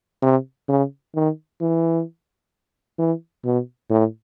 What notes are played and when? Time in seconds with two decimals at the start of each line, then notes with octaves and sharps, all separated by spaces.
0.23 C3
0.69 C#3
1.15 D#3
1.61 E3
2.99 E3
3.45 B2
3.90 A2